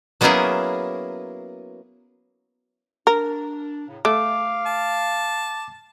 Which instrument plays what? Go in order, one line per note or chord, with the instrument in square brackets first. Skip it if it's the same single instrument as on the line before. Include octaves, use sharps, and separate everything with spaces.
[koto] F#3 A#3 B3 C#4 E4 G#4
[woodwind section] D4 [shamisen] A#4
[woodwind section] A2 C#3
[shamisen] A3 [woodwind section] F5 [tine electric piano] D6
[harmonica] A5